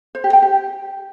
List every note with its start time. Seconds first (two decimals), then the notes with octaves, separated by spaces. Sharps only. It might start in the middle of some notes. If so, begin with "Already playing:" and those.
0.15 C5
0.24 G4
0.33 G5
0.42 G4